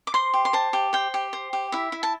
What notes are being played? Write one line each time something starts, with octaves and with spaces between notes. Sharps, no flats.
D6
C5 C6
G4
C6
C5 A5
G4
C5 G5
G4
C5
G4
E4 E5
E4
A5